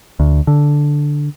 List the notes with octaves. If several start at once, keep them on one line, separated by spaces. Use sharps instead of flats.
D2
D3